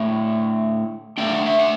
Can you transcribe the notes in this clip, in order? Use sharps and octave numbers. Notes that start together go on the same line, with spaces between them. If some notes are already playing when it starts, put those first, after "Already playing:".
Already playing: D3 A3 E4 E5
D3 A3 D4 G5
F#5
E5
F#5